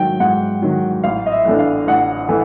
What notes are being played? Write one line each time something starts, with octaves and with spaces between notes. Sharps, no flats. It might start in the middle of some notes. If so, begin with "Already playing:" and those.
Already playing: G#2 D#3 F#3 G5
G#2 F#5
D#3 F#3
A1 F5
D#5
E5
A2 E3 A3 D4
F5
A1 F#5
E3 A3